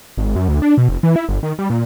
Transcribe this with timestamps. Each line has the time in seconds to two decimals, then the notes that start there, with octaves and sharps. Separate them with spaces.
0.17 G#1
0.36 F#2
0.48 D2
0.62 D4
0.78 B2
0.89 F1
1.03 E3
1.16 E4
1.29 G1
1.43 D#3
1.59 G3
1.70 A#2